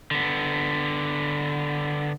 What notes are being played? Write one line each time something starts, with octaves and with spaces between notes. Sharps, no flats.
D3 B3